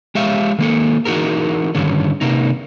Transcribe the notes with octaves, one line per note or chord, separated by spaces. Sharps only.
G#3 G4 C#5 E5 F5
D#3 A#3 A4
E3 D#4 F#4 G#4 A#4
G2 D3 D#3 C#4
C3 A#3 D#4